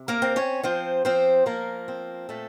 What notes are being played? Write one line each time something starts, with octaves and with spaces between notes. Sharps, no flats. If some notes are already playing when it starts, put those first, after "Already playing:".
Already playing: C3
A#3 A#4
C4
C#4 C#5
F3 C4 C5
F3 C4 C5
F3 A#3 A#4
C4
A#2 A3 A4